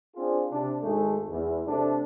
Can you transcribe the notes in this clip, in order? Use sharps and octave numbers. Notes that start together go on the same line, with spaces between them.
C4 D4 F4 G#4
C3 D4
G#1 G#3 A3 G#4
E2
C3 A3 D4